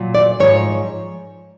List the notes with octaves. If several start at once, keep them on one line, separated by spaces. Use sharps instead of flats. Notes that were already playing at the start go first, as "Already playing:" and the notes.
Already playing: A#2 F#3
D5
G#2 F3 C#5